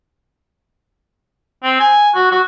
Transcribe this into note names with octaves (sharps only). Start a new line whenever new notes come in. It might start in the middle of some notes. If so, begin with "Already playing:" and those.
C4
G#5
F#4
F#4